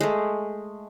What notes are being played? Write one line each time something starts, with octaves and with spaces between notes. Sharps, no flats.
G#3 A3